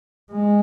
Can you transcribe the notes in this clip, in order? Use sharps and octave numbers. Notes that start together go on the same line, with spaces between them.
G#3